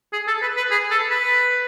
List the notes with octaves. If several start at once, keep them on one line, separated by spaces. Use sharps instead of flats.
G#4
A4
B4
B4
G#4
A4
B4